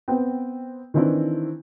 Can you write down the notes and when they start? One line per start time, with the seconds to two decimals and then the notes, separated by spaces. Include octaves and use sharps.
0.08 B3 C4 G5
0.94 D#3 E3 C4 D4 E4